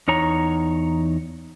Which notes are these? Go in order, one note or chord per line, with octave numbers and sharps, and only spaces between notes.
E2 D#4 C#5 A#5